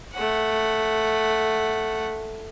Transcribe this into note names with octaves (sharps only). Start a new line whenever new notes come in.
A3 F#5